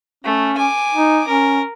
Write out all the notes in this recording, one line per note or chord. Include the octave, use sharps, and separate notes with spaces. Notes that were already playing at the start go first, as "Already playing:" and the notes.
A3 C#4
G#5 D6
D#4
C#4 A#4